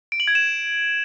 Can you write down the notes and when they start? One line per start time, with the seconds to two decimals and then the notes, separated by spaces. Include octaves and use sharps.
0.12 D7
0.20 F#7
0.27 G#6
0.35 E7